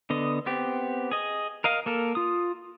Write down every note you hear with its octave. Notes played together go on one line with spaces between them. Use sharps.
D3 B3 D#5
B3 C4 G4
G#4 D#5
A#4 D#5 F5
A#3 A4 A#4
F4 D#6